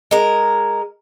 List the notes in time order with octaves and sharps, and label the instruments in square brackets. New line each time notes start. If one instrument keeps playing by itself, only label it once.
[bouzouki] G#3 A#4